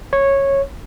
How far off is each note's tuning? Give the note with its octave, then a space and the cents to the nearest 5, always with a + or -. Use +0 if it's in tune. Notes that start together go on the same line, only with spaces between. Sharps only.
C#5 -10